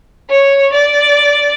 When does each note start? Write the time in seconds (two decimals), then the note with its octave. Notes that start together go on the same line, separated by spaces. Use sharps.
0.29 C#5
0.72 D5